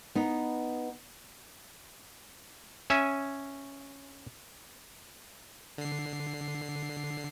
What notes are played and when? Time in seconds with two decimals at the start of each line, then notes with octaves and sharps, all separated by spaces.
0.15 B3 D#4
2.90 C#4 E5 G#5
5.78 D3 C7